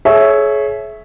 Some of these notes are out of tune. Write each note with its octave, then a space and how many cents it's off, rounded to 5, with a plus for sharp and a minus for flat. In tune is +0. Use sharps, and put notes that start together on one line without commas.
G#4 +40 C#5 +0 E5 +0